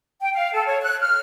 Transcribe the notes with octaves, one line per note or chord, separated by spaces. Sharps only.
G5
F5
A4
C#5
F#6
F6